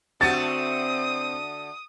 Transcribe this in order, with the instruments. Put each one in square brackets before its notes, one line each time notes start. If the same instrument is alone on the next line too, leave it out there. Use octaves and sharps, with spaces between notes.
[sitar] D3 A3 F#4 [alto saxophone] C4 [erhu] D#6 [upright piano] A6